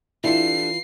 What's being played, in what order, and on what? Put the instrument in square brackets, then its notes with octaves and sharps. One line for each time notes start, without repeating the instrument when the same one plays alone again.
[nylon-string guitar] E3 F4 [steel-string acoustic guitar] D4 G4 A4 [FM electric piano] E4 [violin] C7